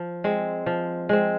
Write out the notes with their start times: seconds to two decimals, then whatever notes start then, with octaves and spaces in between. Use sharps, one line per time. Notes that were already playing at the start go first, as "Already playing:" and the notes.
Already playing: F3
0.24 G#3 C4
0.66 F3
1.09 G#3 C4